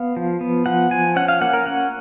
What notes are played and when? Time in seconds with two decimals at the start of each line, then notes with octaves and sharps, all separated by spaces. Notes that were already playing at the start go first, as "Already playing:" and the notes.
Already playing: B3 F5
0.16 F3
0.41 B3
0.66 F3 F#5
0.91 F3 G#5
1.16 C#4 F#5
1.28 F5
1.42 A#3 F#5
1.53 A#4
1.66 C#4 F#5